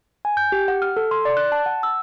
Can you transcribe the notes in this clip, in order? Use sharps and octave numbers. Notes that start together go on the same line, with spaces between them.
G#5
G6
G4
F#5
F6
A4
C6
D5
F#6
A5
F#5
E6